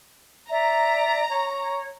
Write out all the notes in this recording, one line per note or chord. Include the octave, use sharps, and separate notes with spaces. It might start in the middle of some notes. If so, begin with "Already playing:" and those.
D5 E5 A#5
C#5